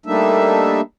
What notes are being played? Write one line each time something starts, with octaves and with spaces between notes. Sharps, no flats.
G3 A3 A#3 D4 D#4 E5